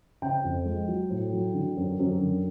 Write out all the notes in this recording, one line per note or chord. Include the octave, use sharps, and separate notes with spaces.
C#3 G5
F2
G#3
F#3
A2
F#3
D3
F#2
F#2
D3